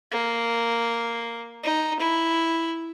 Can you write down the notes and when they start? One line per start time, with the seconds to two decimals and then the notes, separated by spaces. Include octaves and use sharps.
0.12 A#3
1.63 D#4
2.00 E4